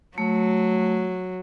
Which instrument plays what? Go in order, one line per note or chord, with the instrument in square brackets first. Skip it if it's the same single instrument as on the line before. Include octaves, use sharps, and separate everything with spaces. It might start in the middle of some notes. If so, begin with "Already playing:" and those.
[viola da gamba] F#3 [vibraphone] A3